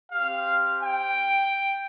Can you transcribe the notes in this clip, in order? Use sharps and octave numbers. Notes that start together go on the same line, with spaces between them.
C4 G4 F5
G5